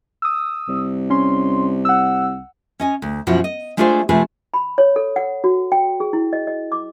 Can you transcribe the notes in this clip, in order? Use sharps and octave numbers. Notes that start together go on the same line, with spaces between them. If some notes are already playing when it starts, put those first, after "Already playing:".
D#6 E6
C2
C#4 C6
F#5 E6
C#4 D#5 G#5
D2
F#2 B2 F3 E4 F#4
D#5
G#3 A3 D4 F4 G#4 C5
C3 F3 A3 G#4 B4
B5
C#5
A4
F#5
F#4
G5
G#4
E4
D#5
D#5
D6